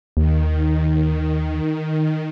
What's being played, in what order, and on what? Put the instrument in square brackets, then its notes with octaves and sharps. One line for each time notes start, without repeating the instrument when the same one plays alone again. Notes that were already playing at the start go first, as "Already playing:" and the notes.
[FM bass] D#2 [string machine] D#3